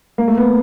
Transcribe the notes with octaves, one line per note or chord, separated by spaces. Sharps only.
A#3
A3
B3